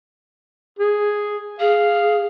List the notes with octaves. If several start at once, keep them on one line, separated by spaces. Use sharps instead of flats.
G#4
G#4 F5